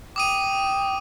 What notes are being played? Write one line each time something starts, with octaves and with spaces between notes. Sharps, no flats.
G5 D6 D#6 D#7